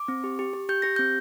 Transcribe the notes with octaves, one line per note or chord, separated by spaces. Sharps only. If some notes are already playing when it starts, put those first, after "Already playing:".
Already playing: D6
C4
G4
G4
G4
G4 G6
G4 A#6
C4 G6